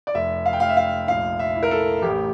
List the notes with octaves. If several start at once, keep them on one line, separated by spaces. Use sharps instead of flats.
D5
F1 E5
F5
G5
F1 F5
E5
F5
A#1 F5
E5
E4
A#4
A4
A1 G4